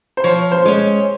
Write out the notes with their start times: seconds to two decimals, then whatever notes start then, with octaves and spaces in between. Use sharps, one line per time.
0.17 C5
0.24 F3 C#5
0.52 C5
0.65 G#3 C#4